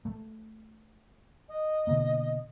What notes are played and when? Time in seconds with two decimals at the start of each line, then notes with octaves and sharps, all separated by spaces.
0.05 A3
1.49 D#5
1.87 B2 D3 A#3